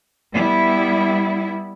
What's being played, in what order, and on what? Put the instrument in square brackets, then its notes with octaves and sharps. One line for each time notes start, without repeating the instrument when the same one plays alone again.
[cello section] G3 B3 E4